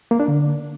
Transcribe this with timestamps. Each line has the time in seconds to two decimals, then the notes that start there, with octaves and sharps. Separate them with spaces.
0.11 A#3
0.20 D4
0.28 D3